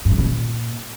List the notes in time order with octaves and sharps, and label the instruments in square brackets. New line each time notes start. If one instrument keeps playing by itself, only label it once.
[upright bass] G2
F#2
B2
A#2